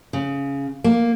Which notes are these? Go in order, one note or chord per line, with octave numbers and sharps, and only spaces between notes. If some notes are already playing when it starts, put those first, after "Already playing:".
C#3
A#3